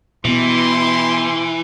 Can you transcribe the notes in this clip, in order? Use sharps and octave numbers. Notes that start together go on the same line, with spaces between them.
B2 E3 B3 E4 G4 C6